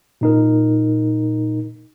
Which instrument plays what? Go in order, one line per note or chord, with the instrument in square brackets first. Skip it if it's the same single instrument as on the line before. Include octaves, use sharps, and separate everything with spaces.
[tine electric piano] A#2 D#4 A#4